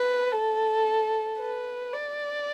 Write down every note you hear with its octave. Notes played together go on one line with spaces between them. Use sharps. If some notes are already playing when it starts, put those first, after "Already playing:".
Already playing: B4
A4
B4
D5